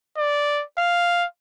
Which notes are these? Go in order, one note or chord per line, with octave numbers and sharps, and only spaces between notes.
D5
F5